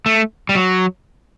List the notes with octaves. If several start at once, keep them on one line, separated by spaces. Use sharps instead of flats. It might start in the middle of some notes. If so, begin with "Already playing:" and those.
A3
G3
F#3